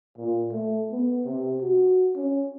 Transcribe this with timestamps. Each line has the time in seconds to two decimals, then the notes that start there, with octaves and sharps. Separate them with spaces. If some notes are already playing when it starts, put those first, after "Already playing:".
0.18 A#2
0.51 A3
0.92 B3
1.25 C3
1.61 F#4
2.16 C#4